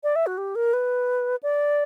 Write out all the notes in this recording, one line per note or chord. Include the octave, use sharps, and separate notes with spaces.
D5
E5
F#4
G4
A#4
B4
D5